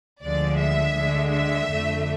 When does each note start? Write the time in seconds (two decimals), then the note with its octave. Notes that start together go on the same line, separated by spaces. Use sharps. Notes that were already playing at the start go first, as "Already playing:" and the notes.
0.23 D2 D3 F3 G#3 D5
0.59 E5
0.96 D2 D3 G#3
1.33 E5
1.69 F2 D3 A3